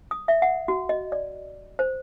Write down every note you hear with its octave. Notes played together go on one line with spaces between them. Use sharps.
D#6
E5
F#5
F#4
D#5
D5
C5